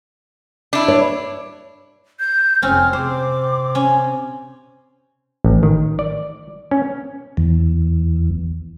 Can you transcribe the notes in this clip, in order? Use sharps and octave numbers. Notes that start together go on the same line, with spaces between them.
D4 E4
C#5
G6
F1 C4 C#4 F6
C3 C4 C5 D6
C#4
A1
D#3
D5
C#4
E2